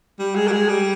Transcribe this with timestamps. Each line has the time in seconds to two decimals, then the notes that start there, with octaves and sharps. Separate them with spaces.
0.19 G3
0.36 G#3
0.47 G3
0.52 G#3
0.69 G3